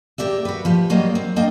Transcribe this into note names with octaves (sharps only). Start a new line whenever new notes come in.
A#3 G4 D5 E5
F#4 B4
F3 G4
F#3 G3 A#3 D#5
C4
A#3 D4 D#5 G5